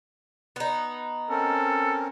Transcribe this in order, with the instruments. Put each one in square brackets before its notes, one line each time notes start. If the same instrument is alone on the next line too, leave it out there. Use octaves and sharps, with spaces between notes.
[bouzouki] B3 D#4
[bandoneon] C4 C#4 A#4 [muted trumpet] A4